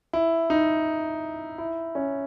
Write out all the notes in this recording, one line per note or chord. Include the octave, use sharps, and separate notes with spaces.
E4
D#4
E4
C#4